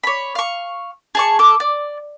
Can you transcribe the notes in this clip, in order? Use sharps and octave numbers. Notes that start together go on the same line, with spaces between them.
C#5 B5
F5 C#6
G#4 A5 C#6
A4 D6
D5